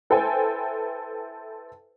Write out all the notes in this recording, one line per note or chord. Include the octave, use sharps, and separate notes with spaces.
E4 A4 B4 C5 G5 G#5